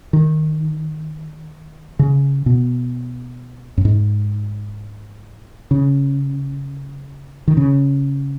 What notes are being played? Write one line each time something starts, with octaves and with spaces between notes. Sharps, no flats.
D#3
C#3
B2
F#2
G#2
C#3
D#3
C#3